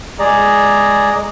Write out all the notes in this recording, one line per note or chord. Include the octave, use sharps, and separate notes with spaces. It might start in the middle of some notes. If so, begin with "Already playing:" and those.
G#3 G#4 D5 A#5